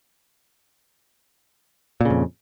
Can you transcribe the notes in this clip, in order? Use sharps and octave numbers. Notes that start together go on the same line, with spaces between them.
F2 A#2 C#3